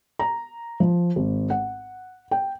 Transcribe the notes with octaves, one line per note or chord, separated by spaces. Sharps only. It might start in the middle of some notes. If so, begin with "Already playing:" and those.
A#5
F3
G#1
F#5
G5